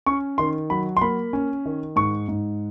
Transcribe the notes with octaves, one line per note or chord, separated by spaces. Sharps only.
C#4 C#6
D#3 C6
F#3 B5
C6
A#3 B5
C#4
D#3
G#2 C#6
G#2